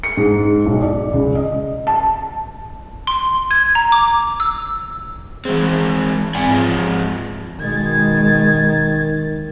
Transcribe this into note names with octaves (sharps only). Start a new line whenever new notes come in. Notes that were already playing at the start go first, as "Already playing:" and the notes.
C#7
G#2
B1
D5
C#2
D#5
A5
C6
G#6
A#5
D6
E6
E3 G#3 C4 G#4
G#2 C4 D5 F#5 G#5
F3 G#3
B2 D#3 G#3 G#6 A6